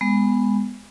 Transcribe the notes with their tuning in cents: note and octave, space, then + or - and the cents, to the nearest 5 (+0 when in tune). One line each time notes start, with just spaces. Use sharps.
G#3 -15 B3 +0